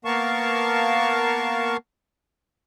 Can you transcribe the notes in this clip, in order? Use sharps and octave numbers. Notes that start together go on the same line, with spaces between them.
A#3 B3 A#4 F5 A5 C#6